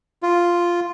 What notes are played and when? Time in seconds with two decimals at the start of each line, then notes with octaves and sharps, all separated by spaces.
0.23 F4